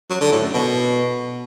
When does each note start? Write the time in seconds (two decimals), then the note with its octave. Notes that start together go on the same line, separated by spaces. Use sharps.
0.10 F#3
0.21 D3
0.32 A2
0.43 F#2
0.54 B2